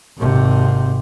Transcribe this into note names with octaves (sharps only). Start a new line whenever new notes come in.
G#1 C3